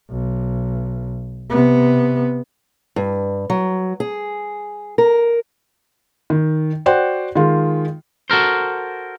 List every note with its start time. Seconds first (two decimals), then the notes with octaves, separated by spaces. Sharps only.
0.10 B1
1.50 C3 B3
2.96 G2
3.50 F#3
4.00 G#4
4.98 A#4
6.30 D#3
6.86 F#4 C5 D5 F#5 G5
7.35 D#3 G#3 F4
8.30 F#4 A4 A#4 C5